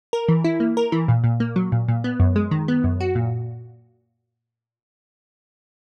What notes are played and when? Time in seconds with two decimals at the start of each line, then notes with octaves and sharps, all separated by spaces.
0.13 A#4
0.28 E3
0.44 E4
0.60 A#3
0.77 A#4
0.92 E3
1.08 A#2
1.24 A#2
1.40 A#3
1.56 F#3
1.72 A#2
1.88 A#2
2.04 B3
2.20 F#2
2.36 G#3
2.51 D#3
2.68 B3
2.84 F#2
3.01 F#4
3.15 A#2